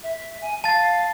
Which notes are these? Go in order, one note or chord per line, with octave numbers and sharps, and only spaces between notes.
E5
G#5
F5 A5 A6